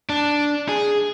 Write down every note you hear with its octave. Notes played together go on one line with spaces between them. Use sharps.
D4
G#4